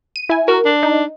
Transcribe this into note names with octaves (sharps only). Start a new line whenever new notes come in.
D#7
E4 G#5
F#4 A#4
D4
D#4